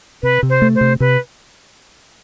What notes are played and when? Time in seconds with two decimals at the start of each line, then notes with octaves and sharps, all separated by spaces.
0.23 C3 B4
0.43 C3
0.50 C5
0.62 A3
0.75 C5
0.81 C3
1.00 C3 B4